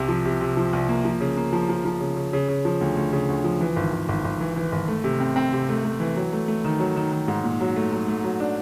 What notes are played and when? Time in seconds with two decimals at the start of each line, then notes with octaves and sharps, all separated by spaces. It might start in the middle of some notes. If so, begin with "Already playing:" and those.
Already playing: C2 C3
0.08 F3
0.25 C3
0.41 C3
0.57 F3
0.73 C2
0.89 A#3
1.05 F3
1.21 C#3
1.37 A#3
1.53 F3
1.69 F3
1.85 F3
2.01 C#3
2.17 C#3
2.33 C#3
2.48 C#3
2.65 F3
2.81 D2
2.97 D2
3.13 C#3
3.28 D2
3.44 F3
3.61 E3
3.76 G#1
3.93 G#1
4.09 G#1
4.25 G#1
4.40 E3
4.56 E3
4.72 G#1
4.88 A3
5.04 C3
5.20 C4
5.36 C4
5.53 C3
5.69 A3
5.84 A3
6.00 E3
6.16 F#3
6.33 A3
6.48 A3
6.64 D#3
6.80 F#3
6.96 D#3
7.12 D#3
7.28 G#2
7.44 A#2
7.61 F#3
7.76 A3
7.92 F#3
8.08 A3
8.24 F#3
8.40 D4